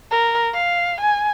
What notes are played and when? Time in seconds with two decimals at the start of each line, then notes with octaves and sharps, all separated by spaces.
0.11 A#4
0.54 F5
1.01 G#5